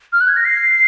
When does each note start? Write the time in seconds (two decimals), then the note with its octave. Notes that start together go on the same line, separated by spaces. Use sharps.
0.13 F6
0.21 F#6
0.28 G#6
0.36 A#6
0.45 C7